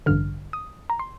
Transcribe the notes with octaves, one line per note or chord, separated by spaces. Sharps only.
A1 G2 D3 F6
D#6
A#5
C6